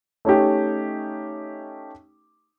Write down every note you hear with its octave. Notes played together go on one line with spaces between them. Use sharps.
A3 C#4 D#4 G4